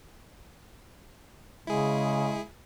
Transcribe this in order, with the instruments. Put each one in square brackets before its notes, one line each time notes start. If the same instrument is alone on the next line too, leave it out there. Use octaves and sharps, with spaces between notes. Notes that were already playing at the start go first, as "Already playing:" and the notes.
[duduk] C#3 [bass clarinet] G#3 [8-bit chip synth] E4 G#4